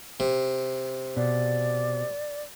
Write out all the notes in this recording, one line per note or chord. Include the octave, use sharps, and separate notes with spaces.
C3
B2 D5